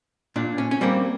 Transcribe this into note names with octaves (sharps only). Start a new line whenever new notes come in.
A#2 D4
C#4
C#4
G3 A#3 C4